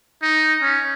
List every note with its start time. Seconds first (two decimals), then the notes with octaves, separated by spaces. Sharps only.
0.22 D#4
0.62 C#4